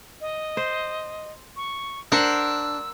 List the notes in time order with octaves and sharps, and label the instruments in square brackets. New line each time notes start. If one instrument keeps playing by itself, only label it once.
[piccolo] D#5
[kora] C5
[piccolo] C#6
[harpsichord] D4 [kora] A#4 C5 F#5 [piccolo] E6